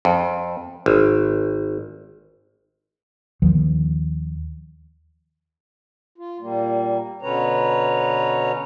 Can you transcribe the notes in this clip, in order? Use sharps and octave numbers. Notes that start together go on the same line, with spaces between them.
F2
G#1
D#2 D#3 F3
F4
A#2 G3 A#3
B2 D3 C#4 B4 C#5 A#5